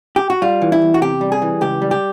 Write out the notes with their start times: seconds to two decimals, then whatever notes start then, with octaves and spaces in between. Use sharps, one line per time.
0.16 G4
0.30 F#4
0.42 G3 F4
0.62 E3
0.72 E4
0.82 E2
0.94 F#4
1.01 C3 G4
1.21 G3
1.32 G#4
1.42 E3
1.61 C#2 G4
1.82 G3
1.91 G4